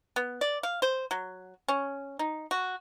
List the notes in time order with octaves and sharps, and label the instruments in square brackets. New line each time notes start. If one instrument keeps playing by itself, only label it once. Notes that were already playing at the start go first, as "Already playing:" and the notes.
[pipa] B3
D5
F5
C5
F#3
C#4
D#4
F#4